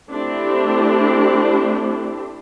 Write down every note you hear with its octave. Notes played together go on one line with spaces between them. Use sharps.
A3 C4 D4 E4 G4